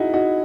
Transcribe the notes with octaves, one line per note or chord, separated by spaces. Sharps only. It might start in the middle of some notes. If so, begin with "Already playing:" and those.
Already playing: D#4 E4 F#4 G#4
D#4 F#4